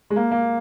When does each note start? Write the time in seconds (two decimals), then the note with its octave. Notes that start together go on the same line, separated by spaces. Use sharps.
0.10 G#3
0.16 A#3
0.31 A#3